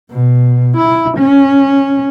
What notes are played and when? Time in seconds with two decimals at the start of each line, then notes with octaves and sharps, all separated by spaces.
0.11 B2
0.77 E4
1.17 C#4